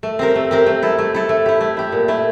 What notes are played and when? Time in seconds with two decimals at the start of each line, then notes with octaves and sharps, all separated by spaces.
0.03 A3
0.19 C4 G4 A#4
0.35 A3
0.51 C4 G4 A#4
0.67 A3
0.83 E4 A4
0.99 A3
1.15 E4 A4
1.29 A3
1.46 E4 G4
1.61 A3
1.77 E4 G4
1.92 A#2
2.08 A3 E4